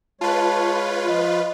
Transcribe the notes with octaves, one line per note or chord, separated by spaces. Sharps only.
G#3 F4 B4 C#5 A5
F3 D#5